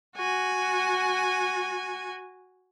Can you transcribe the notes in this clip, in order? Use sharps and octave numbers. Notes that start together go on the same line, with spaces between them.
F#4 G#5